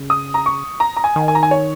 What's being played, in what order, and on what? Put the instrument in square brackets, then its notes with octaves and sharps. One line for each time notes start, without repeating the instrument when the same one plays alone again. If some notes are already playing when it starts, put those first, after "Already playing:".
Already playing: [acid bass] C#3
[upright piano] D#6
A#5
C#6
A#5
A#5
G#5
[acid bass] D#3
[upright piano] G#5
A#5
G#5
C#5